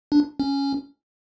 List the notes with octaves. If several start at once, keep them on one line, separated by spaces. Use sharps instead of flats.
D4
C#4